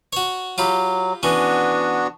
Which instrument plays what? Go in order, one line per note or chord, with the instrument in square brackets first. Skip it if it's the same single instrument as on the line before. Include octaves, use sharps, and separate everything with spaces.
[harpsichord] F#4 C#5
[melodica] F#3 [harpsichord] F4 G4 B5
[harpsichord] E3 C#4 [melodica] B3 D4 F#4